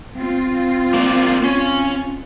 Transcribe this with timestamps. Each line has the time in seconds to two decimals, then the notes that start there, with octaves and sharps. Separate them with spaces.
0.17 C4 F4
0.94 A#3 C5 D5
1.44 C#4